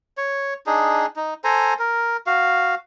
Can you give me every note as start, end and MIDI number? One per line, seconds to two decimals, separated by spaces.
0.17 0.54 73
0.67 1.06 62
0.67 1.06 63
0.67 1.06 68
1.16 1.34 63
1.44 1.74 69
1.44 1.74 72
1.44 1.74 80
1.44 1.74 82
1.79 2.17 70
2.26 2.75 66
2.26 2.75 77